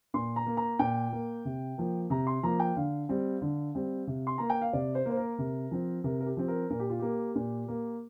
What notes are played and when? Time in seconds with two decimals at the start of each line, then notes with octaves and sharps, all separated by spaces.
0.14 A#2 C6
0.36 A#5
0.47 A#3
0.57 A#5
0.79 A#2 G5
1.13 A#3
1.45 C3
1.78 F3 A#3
2.10 C3 A#5
2.27 C6
2.43 F3 A#3 A#5
2.60 G5
2.76 D3 F5
3.09 G3 C4
3.42 D3
3.75 G3 C4
4.07 C3
4.27 C6
4.38 A#3 A#5
4.50 G5
4.62 F5
4.73 C3 D5
4.95 C5
5.06 A#3 C5
5.17 A#4
5.39 C3
5.71 F3 C4
6.04 C3 A#4
6.20 A#4
6.26 G4
6.37 F3 C4
6.48 A#4
6.70 A#2 A#4
6.79 G4
6.90 F4
6.99 A#3 G4
7.35 A#2
7.68 A#3